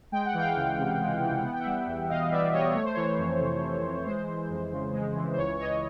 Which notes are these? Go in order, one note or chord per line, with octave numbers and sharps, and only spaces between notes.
G#3 G5
F#5
E3
F5 G5
C#2
C3
G#3
E3
B3 F#5
G5
E5 F#5
G3
E2
B2 D#5 F5
B3 D5 E5
G3 C#5 D#5
A3 C#5
C5
E3 C#5
F2
C3
A3
E3
G#3 C5
E3
F2
C#3
G#3
E3
C5
C#2 C#5
E3 C#5 D#5